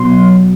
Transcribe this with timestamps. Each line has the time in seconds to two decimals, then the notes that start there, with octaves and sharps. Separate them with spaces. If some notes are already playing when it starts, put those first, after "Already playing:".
Already playing: B2 F#3 B3 C6